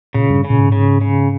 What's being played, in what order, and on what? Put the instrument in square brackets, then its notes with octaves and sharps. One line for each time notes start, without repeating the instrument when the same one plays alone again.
[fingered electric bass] A#2 [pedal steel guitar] C#3
[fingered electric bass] G2
[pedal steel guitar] C#3
[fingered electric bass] A#2
G#2
[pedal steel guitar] C#3
C#3